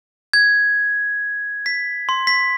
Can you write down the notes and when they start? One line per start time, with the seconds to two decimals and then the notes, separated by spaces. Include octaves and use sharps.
0.33 G#6
1.66 B6
2.09 C6
2.27 B6